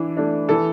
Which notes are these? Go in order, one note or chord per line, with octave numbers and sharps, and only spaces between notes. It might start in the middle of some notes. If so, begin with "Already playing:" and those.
Already playing: E3 D4
A3 D4
E3 A4